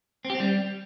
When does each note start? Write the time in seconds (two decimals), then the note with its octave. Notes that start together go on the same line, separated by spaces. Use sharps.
0.25 C4
0.30 G4
0.35 C4
0.40 G3